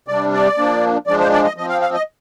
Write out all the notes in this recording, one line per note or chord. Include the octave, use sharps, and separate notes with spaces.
C3 G3 D4 D5
D5
F3 A#3 D4
F3 G#3 D4 D5
C5
D5
D#5
F3 C4 D#5
F5
F5
D#5